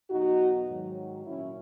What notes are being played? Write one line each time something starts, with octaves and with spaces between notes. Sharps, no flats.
E2 B2 F#3 D#4 F#4
G#2 D#3 F#3
A#2 F#3 C#4 E4